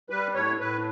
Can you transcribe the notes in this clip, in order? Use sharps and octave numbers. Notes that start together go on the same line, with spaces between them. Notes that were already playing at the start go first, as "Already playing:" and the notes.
G3 B4
A2 C#5
A2 B4